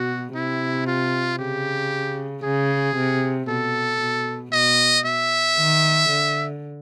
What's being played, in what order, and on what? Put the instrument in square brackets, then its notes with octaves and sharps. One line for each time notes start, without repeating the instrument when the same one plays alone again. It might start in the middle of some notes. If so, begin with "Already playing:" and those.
Already playing: [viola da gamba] B2 [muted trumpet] F#4
[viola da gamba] C3 [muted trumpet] E4
[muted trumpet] F4
[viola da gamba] C#3 [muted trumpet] G4
[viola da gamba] C#3 [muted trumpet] G#4
[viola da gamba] C3
[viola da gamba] B2 [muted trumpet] A4
[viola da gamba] B2
[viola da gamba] B2 [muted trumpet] D#5
[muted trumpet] E5
[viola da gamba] D#3
D3